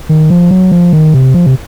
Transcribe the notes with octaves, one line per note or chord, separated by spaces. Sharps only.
D#3
F3
F#3
F3
D#3
C3
F3
C3